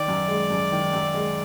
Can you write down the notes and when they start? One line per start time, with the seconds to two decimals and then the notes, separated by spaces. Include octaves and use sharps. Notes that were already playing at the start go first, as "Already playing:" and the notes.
Already playing: D#3 D5
0.08 F#2
0.28 G#3
0.50 F#2
0.72 D#3
0.93 F#2
1.14 G#3